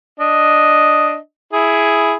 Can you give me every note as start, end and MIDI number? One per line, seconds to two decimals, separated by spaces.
0.20 1.17 62
0.20 1.17 75
1.53 2.14 64
1.53 2.14 68